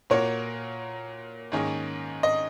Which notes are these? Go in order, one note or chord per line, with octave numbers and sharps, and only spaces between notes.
A#2 A#3 F#4 A#4 C#5
G#2 D#3 A#3 C#4 G#4
D#5